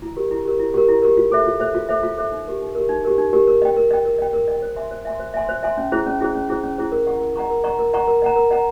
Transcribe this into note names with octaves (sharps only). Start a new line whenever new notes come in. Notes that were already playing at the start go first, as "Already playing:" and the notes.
E4
G4 A#4
E4
G4 A#4
E4
G4 A#4
E4
G4 A#4
F4
A4 C5 E5
F4
A4 C5 E5
F4
A4 C5 E5
F4
A4 C5 E5
D#4
G4 A#4
D#4
G4 A#4
D#4
G4 A#4
D#4
G4 A#4
A#4
D#5 G5
A#4
D#5 G5
A#4
D#5 G5
A#4
D#5 G5
C5
E5 G#5 C6
C5
E5 G#5 C6
C5
E5 G#5 C6
C5
E5 G#5 C6
C#4
E4 G#4 C5
C#4
E4 G#4 C5
C#4
E4 G#4 C5
C#4
E4 G#4 C5
A#4
D#5 F#5 A#5 C#6
A#4
D#5 F#5 A#5 C#6
A#4
D#5 F#5 A#5 C#6
A#4
D#5 F#5 A#5 C#6
A#4
D#5 F#5 A#5
A#4
D#5 F#5 A#5